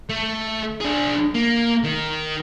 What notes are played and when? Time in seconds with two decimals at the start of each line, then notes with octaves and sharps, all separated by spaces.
0.09 A3
0.80 D4 G#4
1.34 A#3
1.84 D#3